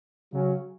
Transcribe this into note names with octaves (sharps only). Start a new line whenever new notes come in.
C#3 F#3 C#4